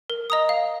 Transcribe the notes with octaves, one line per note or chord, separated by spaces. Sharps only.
A#4
D#5 A#5 D#6
F5